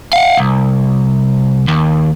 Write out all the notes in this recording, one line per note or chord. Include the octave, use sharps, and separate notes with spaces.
F5 F#5
C2
D#2